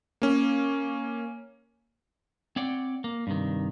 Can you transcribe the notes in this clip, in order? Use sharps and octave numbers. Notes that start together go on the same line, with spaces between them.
A#3 C#4
C4 C#5 D5 F#5 G5
A#3
G2 C3 D#3